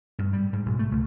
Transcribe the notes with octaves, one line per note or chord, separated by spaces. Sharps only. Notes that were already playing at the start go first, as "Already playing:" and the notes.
G2
G3
G#2
B1
A3
C#2